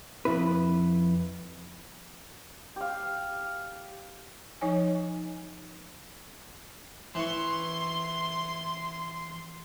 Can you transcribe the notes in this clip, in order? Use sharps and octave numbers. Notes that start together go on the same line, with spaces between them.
F2 B2 E4 B4
G4 F5
F3 D#4 C#5 G#5
E3 C6 C#6